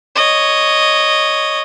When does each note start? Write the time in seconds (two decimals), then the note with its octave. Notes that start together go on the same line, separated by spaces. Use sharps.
0.15 C#5 D#5